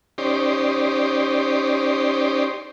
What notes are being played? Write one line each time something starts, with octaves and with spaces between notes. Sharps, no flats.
C#4 D#4 G4 C5 D5